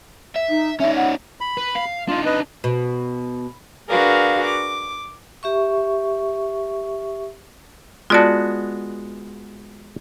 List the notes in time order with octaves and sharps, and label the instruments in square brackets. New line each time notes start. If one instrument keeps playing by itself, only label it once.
[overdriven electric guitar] E5
[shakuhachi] D#4
[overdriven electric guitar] C#4 D#4 [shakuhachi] E5
[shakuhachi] F#5
[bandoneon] B5
[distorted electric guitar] B4
F5
[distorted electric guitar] D4 D#4 [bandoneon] F4
[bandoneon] B4 D#5
[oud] B2
[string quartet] D4 F#4 G#4 A#4 B4 F5
D6
[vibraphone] G4 E5 C#6
[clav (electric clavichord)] G#3 B3 F#4 [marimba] F4 D5 A5